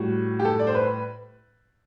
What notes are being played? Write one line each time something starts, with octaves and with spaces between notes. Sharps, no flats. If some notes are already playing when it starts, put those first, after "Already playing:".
Already playing: A2 G3 F#4
G4
A4
D5
C5
B4